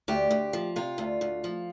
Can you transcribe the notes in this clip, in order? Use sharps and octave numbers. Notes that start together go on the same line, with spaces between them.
D2 G4
D2
F3
C3 F4
D2
D2
F3